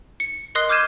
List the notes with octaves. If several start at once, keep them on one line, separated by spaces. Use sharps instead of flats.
C#7
A#4 D#5 C6 D#6 F#6 C7
D6 F6 G6 G#6 D#7 E7